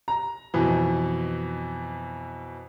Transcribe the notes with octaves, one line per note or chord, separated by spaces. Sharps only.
A#5
F2 B2 E3